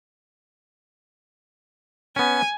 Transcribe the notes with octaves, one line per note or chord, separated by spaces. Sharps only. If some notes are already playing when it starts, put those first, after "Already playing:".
B3 C#4 G#5